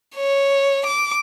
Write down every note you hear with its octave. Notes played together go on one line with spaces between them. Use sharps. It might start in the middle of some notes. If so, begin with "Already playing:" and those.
C#5
D6